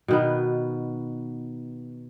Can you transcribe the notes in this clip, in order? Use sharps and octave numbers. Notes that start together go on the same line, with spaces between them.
B2 D#3 B3